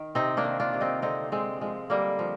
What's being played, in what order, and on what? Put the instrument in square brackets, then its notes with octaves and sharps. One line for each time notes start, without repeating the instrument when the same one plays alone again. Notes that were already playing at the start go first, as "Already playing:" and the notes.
Already playing: [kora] D#3
C3 C4 D#4
A#3 D4
D#3
D4 F4
C3
C4 D#4
D3 C4 D#4
D3 G#3 C4
F3 G#3
D3 G3 A#3
F3